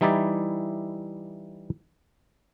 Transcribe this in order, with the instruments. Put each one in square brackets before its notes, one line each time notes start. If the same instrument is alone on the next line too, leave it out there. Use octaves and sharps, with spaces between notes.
[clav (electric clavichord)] E3 G3 D#4 E4 D5 E5